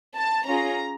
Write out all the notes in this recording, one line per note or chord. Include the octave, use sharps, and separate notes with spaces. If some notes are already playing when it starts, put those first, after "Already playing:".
A5
C#4 F4 G#4 A#5